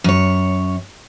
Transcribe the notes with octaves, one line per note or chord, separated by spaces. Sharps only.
F#2 C#5